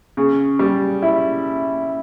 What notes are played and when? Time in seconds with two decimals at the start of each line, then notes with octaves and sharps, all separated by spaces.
0.17 C#3
0.59 G3
1.02 E4